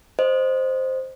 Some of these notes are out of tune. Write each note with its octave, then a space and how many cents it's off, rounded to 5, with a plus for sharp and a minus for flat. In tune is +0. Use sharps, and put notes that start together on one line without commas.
C5 +0 D#5 -15